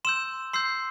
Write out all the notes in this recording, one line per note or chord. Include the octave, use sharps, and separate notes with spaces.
C6 E6 G6 E7
C6 E6 G6 C7